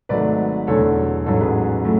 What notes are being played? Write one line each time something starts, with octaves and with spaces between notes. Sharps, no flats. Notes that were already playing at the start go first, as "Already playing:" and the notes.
G#1 G#2 F#3 A3 B4 D5
E1 E2 D3 F#3 A3 A4 C#5
A1 G#2 F#3 A4 C#5
G#4 B4
A2 F#3 A3